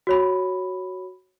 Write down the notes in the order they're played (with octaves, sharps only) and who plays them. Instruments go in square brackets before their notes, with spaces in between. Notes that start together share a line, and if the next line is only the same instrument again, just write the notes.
[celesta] F#4 C#5 B5